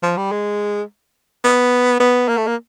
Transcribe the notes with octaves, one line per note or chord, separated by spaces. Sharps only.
F3
G3
G#3
B3
B3
A#3
A3
A#3